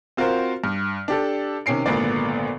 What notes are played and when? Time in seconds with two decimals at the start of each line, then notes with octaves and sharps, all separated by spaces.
0.17 C4 F4 F#4 A#4 C5
0.64 G2
1.08 D4 G4 A4
1.66 C3 D#3 C#4 C7 D7
1.86 G#1 A#2 D3 B3 D5